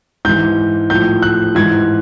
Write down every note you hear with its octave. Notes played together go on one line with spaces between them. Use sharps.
G#2 E3 G6
A2 F3 G6
F#6
G#2 E3 G#6